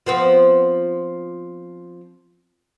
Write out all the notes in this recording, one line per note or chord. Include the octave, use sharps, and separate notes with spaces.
F3 B3 C4